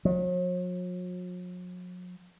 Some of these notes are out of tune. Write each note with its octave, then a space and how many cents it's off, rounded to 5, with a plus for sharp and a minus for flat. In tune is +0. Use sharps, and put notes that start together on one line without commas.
F#3 -45